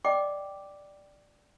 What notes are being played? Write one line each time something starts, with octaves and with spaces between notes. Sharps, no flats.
D5 D#5 G5 D6